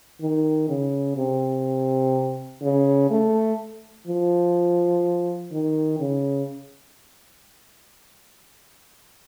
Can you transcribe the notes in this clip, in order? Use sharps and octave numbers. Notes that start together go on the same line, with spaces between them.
D#3
C#3
C3
C#3
A3
F3
D#3
C#3